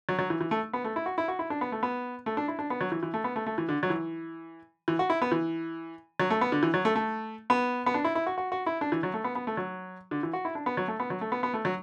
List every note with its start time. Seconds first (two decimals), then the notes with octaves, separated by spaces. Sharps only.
0.09 F#3
0.19 F#3
0.30 E3
0.41 E3
0.51 A3
0.73 B3
0.84 A3
0.96 E4
1.06 F#4
1.18 E4
1.28 F#4
1.39 E4
1.50 D4
1.61 B3
1.72 A3
1.83 B3
2.26 A3
2.37 D4
2.48 E4
2.59 D4
2.70 B3
2.81 F#3
2.92 E3
3.03 E3
3.14 A3
3.24 B3
3.36 A3
3.46 A3
3.58 E3
3.69 D3
3.83 F#3
3.90 E3
4.88 E3
4.99 F#4
5.10 E4
5.22 B3
5.32 E3
6.20 F#3
6.30 A3
6.41 B3
6.52 D3
6.63 E3
6.74 F#3
6.85 A3
6.96 A3
7.50 B3
7.86 B3
7.94 D4
8.04 E4
8.15 E4
8.26 F#4
8.38 F#4
8.52 F#4
8.66 E4
8.81 D4
8.92 E3
9.03 F#3
9.14 A3
9.24 B3
9.35 B3
9.47 A3
9.57 F#3
10.11 D3
10.23 E3
10.33 F#4
10.45 E4
10.55 D4
10.66 B3
10.77 F#3
10.88 A3
11.00 B3
11.10 F#3
11.21 A3
11.32 B3
11.43 B3
11.54 A3
11.65 F#3